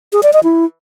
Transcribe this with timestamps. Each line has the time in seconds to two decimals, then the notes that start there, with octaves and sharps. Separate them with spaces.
0.13 G#4
0.23 D5
0.33 D#5
0.44 E4